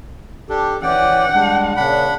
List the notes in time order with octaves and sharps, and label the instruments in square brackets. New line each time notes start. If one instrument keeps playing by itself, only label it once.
[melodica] D4 [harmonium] G4 A4
[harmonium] E3 C#4 D5 [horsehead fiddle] F#5 [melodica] G5
[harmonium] G3 G#3 D4
[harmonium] A#2 C#3 [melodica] D4 F#5 B5